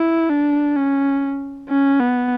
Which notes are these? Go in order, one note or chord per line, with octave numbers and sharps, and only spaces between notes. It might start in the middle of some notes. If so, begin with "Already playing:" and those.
Already playing: E4
D4
C#4
C#4
B3